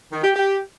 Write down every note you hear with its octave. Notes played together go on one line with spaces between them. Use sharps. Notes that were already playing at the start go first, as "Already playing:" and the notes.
D#3
G4
G4